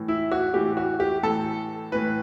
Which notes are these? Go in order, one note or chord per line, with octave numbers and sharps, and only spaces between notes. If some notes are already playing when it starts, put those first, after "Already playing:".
Already playing: A2 E3
E4
F#4
A2 E3 G4
F#4
G4
A2 E3 A4
A2 E3 B4